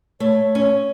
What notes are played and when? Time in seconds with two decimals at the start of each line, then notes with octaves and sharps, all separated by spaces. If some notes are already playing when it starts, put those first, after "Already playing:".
0.20 A3 C#5
0.55 C#4